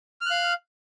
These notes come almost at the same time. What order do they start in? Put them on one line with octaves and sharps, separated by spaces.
F6 F#6 F5